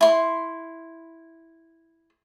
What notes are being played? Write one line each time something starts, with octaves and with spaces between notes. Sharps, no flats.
E4 C6